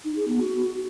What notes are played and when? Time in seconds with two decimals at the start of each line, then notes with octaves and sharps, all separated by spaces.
0.05 D#4
0.16 G#4
0.28 B3
0.39 F#4